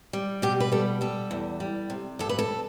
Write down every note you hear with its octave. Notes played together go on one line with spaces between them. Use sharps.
G3
B2 G4
B4
G3 A4
G3 A4
E2
G3
C3
G2 A4
B4
A4